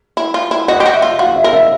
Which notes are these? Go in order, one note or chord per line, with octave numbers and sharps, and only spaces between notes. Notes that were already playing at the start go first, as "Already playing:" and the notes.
E4
F4
E4
F#4 D#5
G4
F#4
E5
F4
F#4 F5
E5
A#4
E5